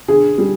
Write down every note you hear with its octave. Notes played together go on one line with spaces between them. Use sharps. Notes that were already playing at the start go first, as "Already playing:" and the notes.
D3 G#4
G3